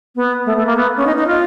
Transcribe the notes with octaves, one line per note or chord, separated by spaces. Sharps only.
B3
A3
A3
A#3
B3
C#4
D#4
D#4
F4